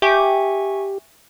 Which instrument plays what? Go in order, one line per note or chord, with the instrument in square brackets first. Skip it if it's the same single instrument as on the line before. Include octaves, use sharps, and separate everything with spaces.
[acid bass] G4 [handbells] E5 G#5 C#6